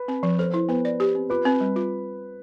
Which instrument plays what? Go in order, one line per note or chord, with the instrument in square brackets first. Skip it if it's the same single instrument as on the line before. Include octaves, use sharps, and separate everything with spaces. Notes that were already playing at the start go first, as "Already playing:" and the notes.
Already playing: [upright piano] B4
[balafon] C4
F3
[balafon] A4 [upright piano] C5
[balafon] E4
[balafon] B3 [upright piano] B4
[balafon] D5
G4
C4
[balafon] F4 [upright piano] B4
[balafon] C4
G3
F4